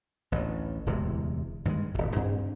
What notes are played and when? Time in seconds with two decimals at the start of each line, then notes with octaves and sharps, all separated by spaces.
0.32 A1 D2 A2
0.86 D1 E2 C3 G#3
1.65 G2 D#3 F3 G#3
1.94 D1 C#2
2.16 G2 C4